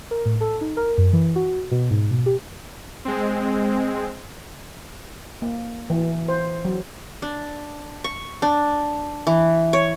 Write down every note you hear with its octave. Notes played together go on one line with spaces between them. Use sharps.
A#4
A2
A4
D#4
A#4
F#2
E3
F#4
B2
G#2
B2
G4
G#3 C4
A#3
E3
C5
F#3
D4
C#6
D4
E3
C#5